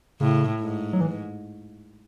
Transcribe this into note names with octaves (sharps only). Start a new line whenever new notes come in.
A2 C#3
G#2
F#3
E3